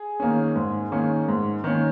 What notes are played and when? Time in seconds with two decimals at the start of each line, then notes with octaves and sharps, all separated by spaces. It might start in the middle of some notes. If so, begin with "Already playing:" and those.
Already playing: G#4
0.20 D#3 A#3 C#4
0.56 G#2
0.92 D#3 A#3 C#4
1.29 G#2
1.64 D#3 A#3 C#4